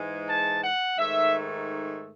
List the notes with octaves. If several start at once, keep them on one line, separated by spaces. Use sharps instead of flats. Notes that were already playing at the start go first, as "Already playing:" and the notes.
Already playing: G#2 E3 G#3
A5
F#5
G#2 D#3 A3 E5